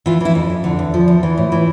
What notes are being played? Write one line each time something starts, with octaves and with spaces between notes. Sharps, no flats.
E3 F4
E3 E4
F2
F2
D3
E2
F3
E2
E3
A2
E3